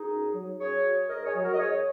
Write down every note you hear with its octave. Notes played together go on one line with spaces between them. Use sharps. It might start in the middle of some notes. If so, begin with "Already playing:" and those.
Already playing: D#4 G#4
F#2
F#3
F#2 G#4 C#5
F#3
G#2 A#4 D#5
G#4 C#5
F#3
F#4 A#4
D#5
G#2 G#4 C#5